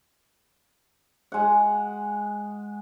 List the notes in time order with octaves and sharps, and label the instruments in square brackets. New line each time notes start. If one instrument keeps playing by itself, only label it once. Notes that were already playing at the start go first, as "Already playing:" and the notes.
[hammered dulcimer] G#3 F#5